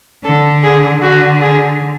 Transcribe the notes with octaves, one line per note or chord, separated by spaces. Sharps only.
D3 A4
G#4
D3 F#4
G#4